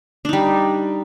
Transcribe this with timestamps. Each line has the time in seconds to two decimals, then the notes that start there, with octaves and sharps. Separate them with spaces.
0.25 D4
0.29 D#4
0.33 G3